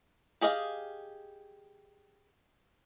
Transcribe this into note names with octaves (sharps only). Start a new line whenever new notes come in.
G4 G#4 D#5 F5